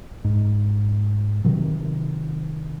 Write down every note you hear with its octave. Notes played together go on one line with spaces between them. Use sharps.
G#2
C3 D#3 F#3